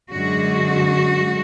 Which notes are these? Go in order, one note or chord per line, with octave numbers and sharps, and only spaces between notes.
F#2 D3 G#3 F#4